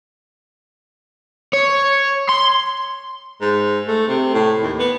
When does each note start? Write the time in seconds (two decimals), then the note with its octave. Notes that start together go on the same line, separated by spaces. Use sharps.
1.54 C#5
2.29 C6
3.41 G#2
3.87 A3
4.08 C3
4.34 A2
4.62 D#2
4.79 B3